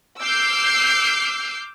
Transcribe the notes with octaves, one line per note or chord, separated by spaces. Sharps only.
D6 E6 F6 G6 C7